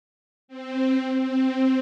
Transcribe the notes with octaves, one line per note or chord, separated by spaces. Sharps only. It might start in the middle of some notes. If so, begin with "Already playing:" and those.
C4
C4